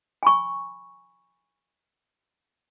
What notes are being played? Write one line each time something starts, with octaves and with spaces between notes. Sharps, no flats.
G#5 B5 C#6